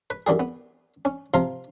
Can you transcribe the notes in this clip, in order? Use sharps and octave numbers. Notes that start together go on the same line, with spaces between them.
B4
F#2 E3 G3 G#4
B3
C#4
C3 F3 F5 A#5 C6